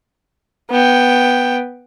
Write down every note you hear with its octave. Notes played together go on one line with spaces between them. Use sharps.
B3 G5